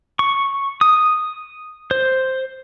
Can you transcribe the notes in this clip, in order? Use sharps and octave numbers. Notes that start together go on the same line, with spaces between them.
C#6
D#6
C5